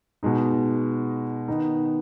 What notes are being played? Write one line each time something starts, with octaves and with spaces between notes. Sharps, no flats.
B2 G#3 D#4
D#3 B3 D#4